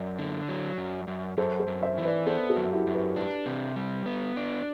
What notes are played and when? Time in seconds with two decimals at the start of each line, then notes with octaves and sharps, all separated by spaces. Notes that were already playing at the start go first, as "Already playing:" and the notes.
Already playing: F#2 D5
0.18 D3
0.49 F#3
0.78 F#2
1.08 F#2
1.37 F#2 A4 C5
1.60 A4 C5
1.68 F#2
1.82 C5 E5
1.98 E3
2.05 B4 D5
2.27 B3 A4 C5
2.50 F#4 A4
2.57 F#2
2.72 E4 G4
2.87 F#2
2.94 G4 B4
3.16 D4 G4 B4
3.46 C3
3.76 G3
4.06 B3
4.36 D4